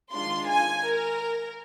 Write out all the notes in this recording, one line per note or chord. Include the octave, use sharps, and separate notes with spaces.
D#3 G#3 D4 F4 C6
G#5
A#4